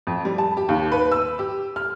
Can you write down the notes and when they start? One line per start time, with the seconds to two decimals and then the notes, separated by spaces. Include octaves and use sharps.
0.07 F2
0.25 G3
0.38 A5
0.57 G4
0.69 D#2
0.92 B4
1.12 E6
1.39 G4
1.76 F6